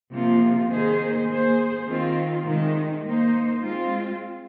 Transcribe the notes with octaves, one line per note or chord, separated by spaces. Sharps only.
C3 F3 A#3 F4
D#3 A#3 G#4 C5
A#3 G#4 C5
D#3 C4 F4
C3 D#3 G#3 D#4
A#3 D#4 C5
G#3 C4 F4